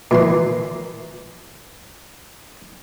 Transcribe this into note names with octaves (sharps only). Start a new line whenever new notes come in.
A#2 E3 C6